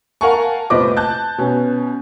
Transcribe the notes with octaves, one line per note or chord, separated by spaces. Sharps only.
A#4 F5 F#5 G#5 A5 C#6
F1 A#2 B4 C5 D#5 D6
A5 F#6 G6
B2 C#4